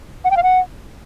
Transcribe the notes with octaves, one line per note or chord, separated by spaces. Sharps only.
F#5
G5
F5
F#5